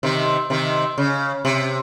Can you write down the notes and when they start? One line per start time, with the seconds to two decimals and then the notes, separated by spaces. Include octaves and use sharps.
0.03 C3 D#3
0.50 C3 D#3
0.98 C#3
1.45 C3